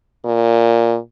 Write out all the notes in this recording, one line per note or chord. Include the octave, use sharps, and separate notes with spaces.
A#2